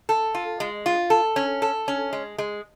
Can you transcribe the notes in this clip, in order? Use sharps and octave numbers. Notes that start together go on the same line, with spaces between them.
A4
F4
G#3
F4
A4
C#4
A4
C#4
G#3
G#3